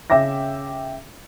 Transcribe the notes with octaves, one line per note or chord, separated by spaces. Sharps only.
C#3 E5 G5 D6 A#6